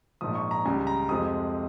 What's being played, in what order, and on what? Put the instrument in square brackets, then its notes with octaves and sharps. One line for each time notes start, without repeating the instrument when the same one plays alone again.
[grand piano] A#1 G#2 F3 D#6
C#6
A#5
C#2 C#3 G3 G#5
A#5
F2 C3 F3 G#3 D#6